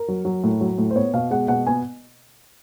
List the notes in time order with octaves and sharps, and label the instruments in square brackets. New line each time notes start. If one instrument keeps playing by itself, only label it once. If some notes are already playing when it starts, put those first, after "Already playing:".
Already playing: [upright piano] A#4
F#3
F#3
A2
F#3
A2
C5
B3 C#5
B2 F5
G#3 F#5
B2 F#5
B3 G#5